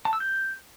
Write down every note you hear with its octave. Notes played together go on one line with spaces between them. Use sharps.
A5
E6
G6